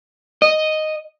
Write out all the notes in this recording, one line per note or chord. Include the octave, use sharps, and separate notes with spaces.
D#5